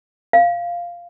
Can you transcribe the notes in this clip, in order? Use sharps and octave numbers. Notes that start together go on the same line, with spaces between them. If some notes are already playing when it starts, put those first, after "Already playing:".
F5